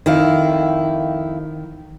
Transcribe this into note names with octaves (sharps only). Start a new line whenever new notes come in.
F2 D#3 E4 F5